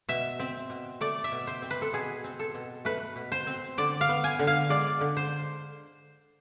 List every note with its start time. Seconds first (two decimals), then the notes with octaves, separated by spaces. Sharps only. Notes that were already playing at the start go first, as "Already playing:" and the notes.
0.09 B2 E5
0.40 C4
0.70 B2
1.01 A3 D5
1.24 E5
1.32 B2
1.47 C5
1.62 C4
1.71 B4
1.82 A4
1.93 B2 G#4
2.24 C4
2.39 A4
2.55 B2
2.85 A3 B4
3.16 B2
3.32 C5
3.47 C4
3.77 D3 D5
4.01 F5
4.09 B3
4.24 G#5
4.39 D3
4.47 F5
4.70 G#3 D5
5.01 D3
5.17 C5